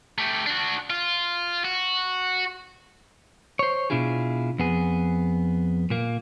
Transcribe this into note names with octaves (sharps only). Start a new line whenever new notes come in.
A3 G4
D4 F#4
F4
F#4
C5 C#5
B2 D4 E4 F4 G#4
F2 B3 G#4
A#2 A#3